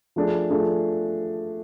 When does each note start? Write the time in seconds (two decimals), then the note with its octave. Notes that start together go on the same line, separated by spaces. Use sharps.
0.16 F3 A3 D4 G#4
0.50 F3 A3 D4 G#4